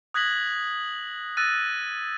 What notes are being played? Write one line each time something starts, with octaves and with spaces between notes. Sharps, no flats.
D#6 F#6 G#6 A#6 B6 F#7
E6 F#6 A6 A#6 D#7